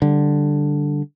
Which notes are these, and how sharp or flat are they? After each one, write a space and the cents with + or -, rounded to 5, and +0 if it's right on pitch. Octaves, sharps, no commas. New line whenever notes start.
D3 +0 G3 +0